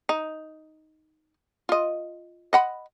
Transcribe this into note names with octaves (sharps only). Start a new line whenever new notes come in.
D#4
F4 D#5
D#5 F#5 B5